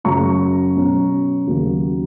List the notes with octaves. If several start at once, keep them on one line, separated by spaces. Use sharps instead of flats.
F#2 C#3 F#3 C#4 A#5 C#6
B2 F#3 C#4
D#2 C#3 F#3